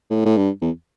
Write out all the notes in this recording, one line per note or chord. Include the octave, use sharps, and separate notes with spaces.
A2
A2
G2
E2